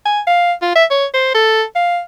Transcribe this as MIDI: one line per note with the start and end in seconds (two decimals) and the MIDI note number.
0.05 0.20 80
0.27 0.52 77
0.62 0.73 65
0.76 0.85 76
0.90 1.05 73
1.14 1.33 72
1.35 1.63 69
1.75 2.00 77